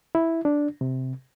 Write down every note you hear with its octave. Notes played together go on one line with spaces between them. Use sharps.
E4
D4
C3